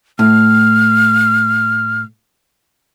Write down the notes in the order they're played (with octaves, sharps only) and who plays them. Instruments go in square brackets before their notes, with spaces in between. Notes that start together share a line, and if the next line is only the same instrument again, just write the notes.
[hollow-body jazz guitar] A2 [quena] F6